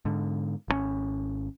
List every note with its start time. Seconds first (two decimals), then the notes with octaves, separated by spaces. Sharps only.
0.05 G#2 D3
0.68 G#1 D3 C#4